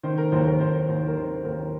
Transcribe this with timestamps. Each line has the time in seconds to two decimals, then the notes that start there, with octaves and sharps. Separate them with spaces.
0.03 D#3 C5
0.18 A#4
0.32 D#2 C5
0.47 A#4
0.60 D#2 C5
0.89 D#2
1.08 A#4
1.17 D#3 C5
1.45 D#2 A#4